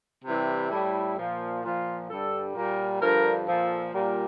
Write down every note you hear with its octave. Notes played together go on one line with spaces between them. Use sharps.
C3 E3 G3 E4
A2 G3
A#2 F3
A#2 F3 F4
G2 D3 G3 A4
A#2 G3 A#4
G2 D3 F3 A#4
A#2 F3 A4
A#2 G3 A#4